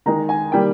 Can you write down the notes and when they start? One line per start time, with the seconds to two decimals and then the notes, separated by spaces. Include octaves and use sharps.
0.06 D#3 G#3 A#5
0.29 G#5
0.52 D#3 G3 A#3 G5